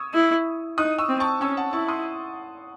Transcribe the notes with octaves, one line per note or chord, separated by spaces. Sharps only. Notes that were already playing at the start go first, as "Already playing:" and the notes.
Already playing: C#6 D#6 E6 G#6
E4
D#4 D#6 F#6
C#6 E6
C4
A5 C#6
C#4 C#6 E6
F#5 A5
E4 A5 C#6
C6 D#6